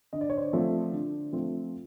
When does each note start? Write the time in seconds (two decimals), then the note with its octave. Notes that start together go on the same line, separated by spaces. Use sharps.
0.13 D3 D#5
0.21 D5
0.29 C#5
0.37 C5 D5
0.53 F3 A3 C4
0.92 D3
1.33 F3 A3 C4